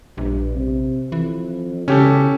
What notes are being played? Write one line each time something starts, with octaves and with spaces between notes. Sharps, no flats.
A#1 G2
C3
F2 E3
E1 C#3 C#4 G4 A4